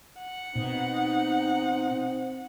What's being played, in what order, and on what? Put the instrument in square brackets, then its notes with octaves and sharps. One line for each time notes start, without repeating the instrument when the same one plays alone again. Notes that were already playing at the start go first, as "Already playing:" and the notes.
[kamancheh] F#5
[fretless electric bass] B2 [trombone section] C4 [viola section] D#4